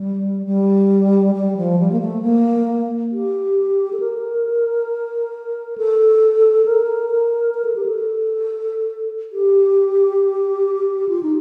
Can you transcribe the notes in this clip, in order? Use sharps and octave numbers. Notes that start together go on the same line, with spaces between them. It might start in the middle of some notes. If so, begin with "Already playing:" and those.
Already playing: G3
G3
G3
F3
G3
A#3
A3
A#3
G4
A4
A#4
A4
A#4
A#4
A#4
A4
G4
A4
G4
F4
D#4